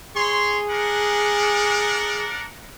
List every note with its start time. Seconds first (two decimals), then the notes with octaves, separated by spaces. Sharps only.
0.15 G#4 C#5 C6
0.70 D4 A#4 F#5